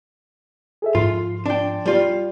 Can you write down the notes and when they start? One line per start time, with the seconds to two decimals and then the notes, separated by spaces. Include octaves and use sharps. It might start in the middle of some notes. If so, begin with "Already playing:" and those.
0.82 G#4 A4 E5
0.95 G#2 F3 F4 C6
1.46 D4 G5
1.86 G3 F4